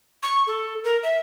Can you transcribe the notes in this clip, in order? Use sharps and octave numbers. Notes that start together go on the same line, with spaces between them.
C#6
A4
A#4
E5